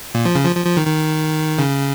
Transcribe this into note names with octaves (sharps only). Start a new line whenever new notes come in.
A#2
F3
C#3
F3
F3
F3
D#3
D#3
C#3